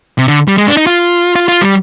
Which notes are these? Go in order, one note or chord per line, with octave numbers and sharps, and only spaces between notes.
C3
D3
G3
G#3
D4
D#4
F4
F4
F4
G3